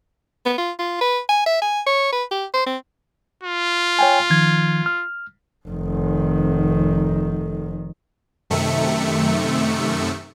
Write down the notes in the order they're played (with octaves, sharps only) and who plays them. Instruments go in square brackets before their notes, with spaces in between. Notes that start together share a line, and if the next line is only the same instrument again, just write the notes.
[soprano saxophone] B3
F4
F4
B4
G#5
E5
G#5
C#5
B4
G4
C5
C4
[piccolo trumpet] F4
[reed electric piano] C#5 G5 G#5
D#3 F3 G#6
F6
[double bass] F1 D#3
[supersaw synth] F#2 C3 D#3 A3 E5 C#7